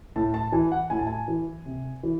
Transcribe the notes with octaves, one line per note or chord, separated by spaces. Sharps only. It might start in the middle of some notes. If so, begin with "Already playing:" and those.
A2 A5
A5
E3 G#5
F#5
A2 G#5
A5
G#5
E3
C3
E3